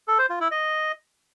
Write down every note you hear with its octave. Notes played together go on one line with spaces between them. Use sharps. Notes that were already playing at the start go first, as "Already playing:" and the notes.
A4
C5
F4
E4
D#5